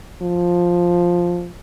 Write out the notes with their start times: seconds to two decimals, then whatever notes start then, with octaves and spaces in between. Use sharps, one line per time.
0.22 F3